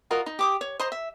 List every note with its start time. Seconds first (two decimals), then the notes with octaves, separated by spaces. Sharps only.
0.11 F4 F#4 A#4 D#5
0.26 D#4
0.39 G4 D6 D#6
0.61 C#5
0.80 C5 D#5 A#5 C6
0.92 E5